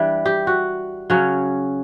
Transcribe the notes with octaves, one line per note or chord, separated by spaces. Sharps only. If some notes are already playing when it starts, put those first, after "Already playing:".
Already playing: E3 G3 D4
G4
F#4
C#3 F#3 C#4